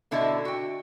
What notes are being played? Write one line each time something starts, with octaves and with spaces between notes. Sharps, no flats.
B2 D3 E4 A4 D#5 E5
F#4 G5